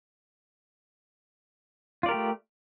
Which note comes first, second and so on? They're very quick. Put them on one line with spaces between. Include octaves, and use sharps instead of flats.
F4 D5 A#4 G4 A3